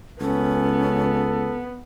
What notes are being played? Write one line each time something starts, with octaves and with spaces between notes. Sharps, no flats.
C#2 B3 C#4 A4